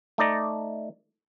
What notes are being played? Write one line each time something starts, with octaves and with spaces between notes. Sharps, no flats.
A3 D#4 D5 A#5